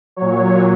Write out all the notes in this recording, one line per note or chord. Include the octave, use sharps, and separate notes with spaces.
A#2 F#3 C#5